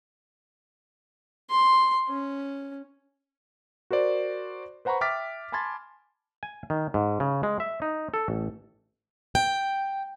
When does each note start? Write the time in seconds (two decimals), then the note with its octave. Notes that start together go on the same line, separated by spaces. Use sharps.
1.50 C6
2.08 C#4
3.91 F#4 A#4 C5 D5
4.85 B4 C5 F#5 A#5 B5 C#6
5.01 E5 G5 D6 F6 A6 B6
5.52 G#5 A5 B5 C6 G#6 A6
6.43 G#5
6.70 D#3
6.94 G#2
7.20 C#3
7.43 G#3
7.60 E5
7.82 D#4
8.14 A4
8.28 A1
9.35 G5